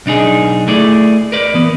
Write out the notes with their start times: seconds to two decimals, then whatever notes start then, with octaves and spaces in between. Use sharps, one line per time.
0.06 B1 D4 D#4 G#4
0.68 A3 E4 G#4 D5
1.32 A#4 B4 D5
1.54 E3 B3